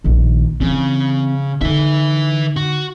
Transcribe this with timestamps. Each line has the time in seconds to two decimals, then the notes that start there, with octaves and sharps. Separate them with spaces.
0.04 A#1 D#3
0.61 C#3 E3 C4
1.61 D3 D#4 B4 E5
2.56 F#4